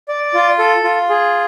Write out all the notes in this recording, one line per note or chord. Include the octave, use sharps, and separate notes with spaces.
D5
F4
A4
F4
G#4